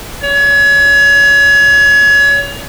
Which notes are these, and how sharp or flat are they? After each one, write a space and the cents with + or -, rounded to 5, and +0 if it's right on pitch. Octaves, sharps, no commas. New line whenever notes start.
C#5 +30